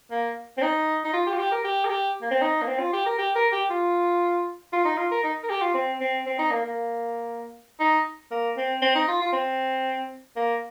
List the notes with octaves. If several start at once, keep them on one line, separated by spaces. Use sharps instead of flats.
A#3
C4
D#4
D#4
F4
G4
F4
G4
A#4
G4
A#4
G4
A#3
C4
D#4
A#3
C4
F4
G4
A#4
G4
A#4
G4
F4
F4
D#4
F4
A#4
D#4
A#4
G4
F4
C4
C4
C4
D#4
A#3
A#3
D#4
A#3
C4
C4
D#4
F4
F4
C4
A#3